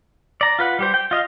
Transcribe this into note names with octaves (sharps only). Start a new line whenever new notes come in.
D5 A#5
F4 B4 F#5
G3 G4 C5
G5
F4 D#5 F5